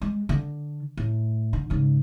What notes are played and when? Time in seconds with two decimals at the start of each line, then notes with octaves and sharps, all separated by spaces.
0.02 G#3
0.29 D3
0.97 A2
1.53 D3
1.70 G#2 C#3